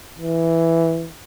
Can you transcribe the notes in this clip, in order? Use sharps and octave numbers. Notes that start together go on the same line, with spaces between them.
E3